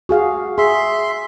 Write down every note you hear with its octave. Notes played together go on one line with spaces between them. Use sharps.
F#4 G#4 F5
G#4 E5 C6